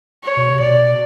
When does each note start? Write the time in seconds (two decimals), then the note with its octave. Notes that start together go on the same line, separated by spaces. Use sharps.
0.24 C#5
0.37 B2
0.49 C3
0.61 B2 D5